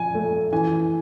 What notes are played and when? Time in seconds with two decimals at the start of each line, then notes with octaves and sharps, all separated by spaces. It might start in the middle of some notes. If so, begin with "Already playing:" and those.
Already playing: F3 G#5
0.15 A3
0.52 E3 G#5